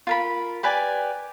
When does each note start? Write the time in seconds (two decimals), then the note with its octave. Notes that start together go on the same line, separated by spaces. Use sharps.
0.07 F4 A#4 B5
0.63 G4 B4 D5 G#5